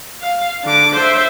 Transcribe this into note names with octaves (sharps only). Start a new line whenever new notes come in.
F5
D3 D6
C5 E5